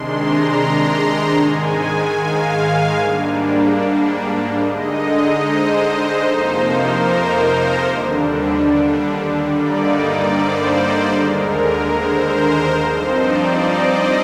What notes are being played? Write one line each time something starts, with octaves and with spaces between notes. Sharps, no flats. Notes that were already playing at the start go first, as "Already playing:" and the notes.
Already playing: C3 D#3 G#3 D4 C6
A#5
C6
G#2 D#3 G#3 G#5
F5
G#2 G3 A#3 D4
D3 G#3 D#4 D#5
C5
C5
F2 C3 F3 A#3 D#4 C5
A#4
C5
D#2 D3 G3 D4
G2 D3 G3 A#3 D#4 D5
D5
C5
D#2 D3 G#3 A#4
C5
A#4
G2 F3 C4 D#4 C5
D5
D#5